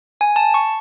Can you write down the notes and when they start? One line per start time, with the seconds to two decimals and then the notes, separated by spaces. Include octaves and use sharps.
0.21 G#5
0.36 A5
0.54 C#6